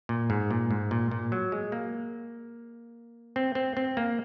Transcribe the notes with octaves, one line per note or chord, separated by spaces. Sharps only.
A#2
G#2
A#2
G#2
A#2
A#2
F#3
G#3
A#3
C4
C4
C4
A#3